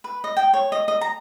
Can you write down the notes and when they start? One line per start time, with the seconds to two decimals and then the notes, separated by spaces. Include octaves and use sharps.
0.04 B4
0.24 D#5
0.37 G5
0.53 C#5
0.72 D#5
0.88 D#5
1.01 A#5